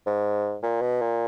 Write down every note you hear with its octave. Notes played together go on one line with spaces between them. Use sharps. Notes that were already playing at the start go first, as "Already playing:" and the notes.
G#2
A#2
B2
A#2